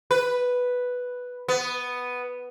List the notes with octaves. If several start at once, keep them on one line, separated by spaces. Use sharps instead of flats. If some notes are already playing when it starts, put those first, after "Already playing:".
B4
B3